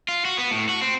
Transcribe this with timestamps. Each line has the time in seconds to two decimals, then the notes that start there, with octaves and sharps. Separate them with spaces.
0.09 F4
0.25 F#4
0.38 B3
0.51 A2
0.69 F#4
0.82 C4